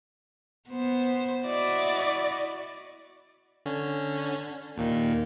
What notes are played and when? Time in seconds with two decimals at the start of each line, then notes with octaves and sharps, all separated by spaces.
0.69 B3 C5
1.46 E4 F#4 D5 D#5
3.66 D3 C#4
4.77 D#2 A#2 D#3 A#3